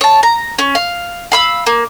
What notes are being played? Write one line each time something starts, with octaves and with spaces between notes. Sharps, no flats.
C#5 A5
A#5
C#4
F5
F5 B5 E6
A#3